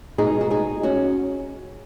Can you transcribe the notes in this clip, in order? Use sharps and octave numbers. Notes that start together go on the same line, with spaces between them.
B2 G#3 D#4 G#4
F#4
D#4 G#4
C#4 F#4